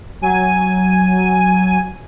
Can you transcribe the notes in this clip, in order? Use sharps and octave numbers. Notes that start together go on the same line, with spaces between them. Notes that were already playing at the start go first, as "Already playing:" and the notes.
F#3 G#5 D#7